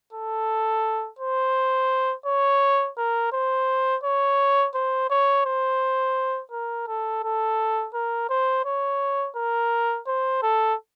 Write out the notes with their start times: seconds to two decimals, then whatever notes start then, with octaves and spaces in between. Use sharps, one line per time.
0.13 A4
1.19 C5
2.26 C#5
2.97 A#4
3.32 C5
4.03 C#5
4.74 C5
5.10 C#5
5.46 C5
6.52 A#4
6.87 A4
7.23 A4
7.94 A#4
8.29 C5
8.65 C#5
9.36 A#4
10.07 C5
10.42 A4